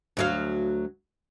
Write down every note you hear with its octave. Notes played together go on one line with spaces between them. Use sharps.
D2 F#3 F5